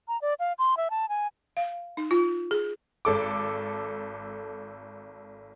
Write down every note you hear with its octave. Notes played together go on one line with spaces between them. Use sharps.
A#5
D5
F5
C6
E5
A5
G#5
F5
D#4
F4
G#4
G#1 A4 D6